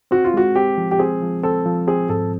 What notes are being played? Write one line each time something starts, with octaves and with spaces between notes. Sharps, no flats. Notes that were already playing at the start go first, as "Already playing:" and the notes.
C4 F#4
F4
G#3 F#4
C4 G4
F3
G4
C4 G#4
F3
C4 A4
F3
C4 G#4
G#2 A4